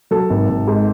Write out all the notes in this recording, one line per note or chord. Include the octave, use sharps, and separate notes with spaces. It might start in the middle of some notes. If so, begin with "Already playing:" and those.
F#3 A4
G#1
G#1
G#2